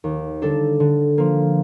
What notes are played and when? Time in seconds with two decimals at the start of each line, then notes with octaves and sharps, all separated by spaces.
0.04 D#2
0.42 D3 G3 D4 A4
0.80 D3
1.18 F3 A#3